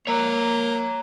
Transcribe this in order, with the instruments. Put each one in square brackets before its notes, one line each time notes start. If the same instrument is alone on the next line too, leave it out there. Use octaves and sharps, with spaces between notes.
[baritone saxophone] A#3 [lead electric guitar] C#5 A#5